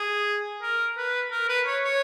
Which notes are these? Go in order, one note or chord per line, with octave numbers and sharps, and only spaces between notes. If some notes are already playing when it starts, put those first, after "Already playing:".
Already playing: G#4
A#4
B4
A#4
B4
C#5
C#5